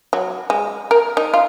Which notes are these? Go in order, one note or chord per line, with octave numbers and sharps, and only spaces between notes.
F#3
G#3
A#4
D#4
F4